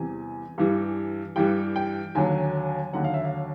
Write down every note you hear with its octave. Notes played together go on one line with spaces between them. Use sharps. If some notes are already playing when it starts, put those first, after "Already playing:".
Already playing: E2 C3 E3 G3 G#5
G2 E3 G3
G2 E3 G3 G5
G5
D#2 D3 F#3 G#5
D#2 D3 F#3 F#5
F5
E5
F5